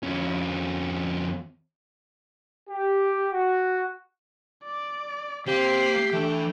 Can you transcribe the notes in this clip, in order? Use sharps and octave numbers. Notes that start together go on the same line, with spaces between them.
F2 C#4
G4
F#4
D5
A#3 C4 G4 F5 C7
E3 A3 D4 G5